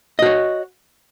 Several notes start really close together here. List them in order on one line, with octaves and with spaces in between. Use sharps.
D#5 F#4 C#5